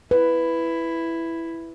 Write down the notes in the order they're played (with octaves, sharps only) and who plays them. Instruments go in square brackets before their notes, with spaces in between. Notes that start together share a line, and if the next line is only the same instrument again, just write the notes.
[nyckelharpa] E4 [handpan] B4